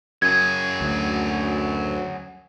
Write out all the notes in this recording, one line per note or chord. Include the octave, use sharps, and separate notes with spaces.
F#2 F#3 G#4 G#6
D2